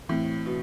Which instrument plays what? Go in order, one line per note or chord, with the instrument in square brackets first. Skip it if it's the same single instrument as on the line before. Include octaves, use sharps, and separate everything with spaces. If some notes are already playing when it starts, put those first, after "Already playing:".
[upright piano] A2 [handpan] E3 A3 C4 E4
[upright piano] B2